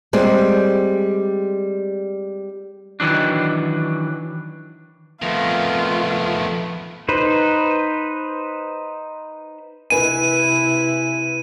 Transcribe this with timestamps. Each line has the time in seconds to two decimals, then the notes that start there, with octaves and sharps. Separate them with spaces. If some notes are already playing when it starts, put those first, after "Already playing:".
0.13 G3 G#3 C4
3.00 D#3 E3 F#3 D4
5.22 F2 D#3 A3 B3 F4
7.08 D#4 B4 C5
9.90 C3 E4 B4 G#5 D#7